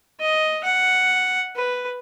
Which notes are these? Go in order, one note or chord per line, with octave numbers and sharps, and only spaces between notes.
D#5
F#5
B4